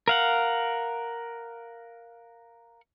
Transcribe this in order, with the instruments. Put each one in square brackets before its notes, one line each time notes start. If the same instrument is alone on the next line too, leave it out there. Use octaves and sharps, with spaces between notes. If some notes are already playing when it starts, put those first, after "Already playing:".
[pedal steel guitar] A#4 F5 F#5